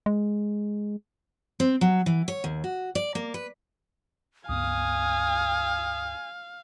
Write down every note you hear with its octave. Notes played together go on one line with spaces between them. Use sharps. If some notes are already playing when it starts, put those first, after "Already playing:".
G#3
C4
F#3
E3
C#5
D#2
F#4
D5
A#3
B4
C#2 G2 B3 F5 G#5 D#6